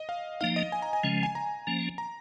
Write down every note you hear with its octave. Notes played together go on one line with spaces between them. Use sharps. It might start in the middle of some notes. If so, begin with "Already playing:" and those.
Already playing: D#5
F5
F3 A#3 D#4 F5
D#5
G#5
A#5
G#5
C#3 F3 G#3 C#4
G#5
A#5
F3 A#3 C#4
A#5